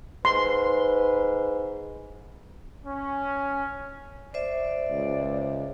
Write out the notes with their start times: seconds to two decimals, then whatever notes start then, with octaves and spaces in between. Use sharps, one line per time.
0.25 G#2 B4 C6
2.84 C#4
4.34 C5 D5 E5
4.91 C#2